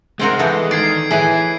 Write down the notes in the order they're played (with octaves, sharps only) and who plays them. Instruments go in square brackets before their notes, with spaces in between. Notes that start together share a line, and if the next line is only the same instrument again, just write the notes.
[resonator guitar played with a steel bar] C3 C4 A#4 [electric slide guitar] G#3 [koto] F#4 G5
[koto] E3 B3 C4 [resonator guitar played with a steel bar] A4
[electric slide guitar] D#3 [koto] D5 [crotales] G#6 C7 D7
[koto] A2 E4 B4 [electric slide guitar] E3 [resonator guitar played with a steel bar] G#4